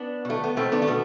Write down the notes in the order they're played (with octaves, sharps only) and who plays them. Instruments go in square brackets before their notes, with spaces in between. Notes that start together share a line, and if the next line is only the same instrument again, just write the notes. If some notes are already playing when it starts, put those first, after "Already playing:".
Already playing: [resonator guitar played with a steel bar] B3 D4
B2 A3
B3
B2 A3 C4
B3 D4
A3
B2 B3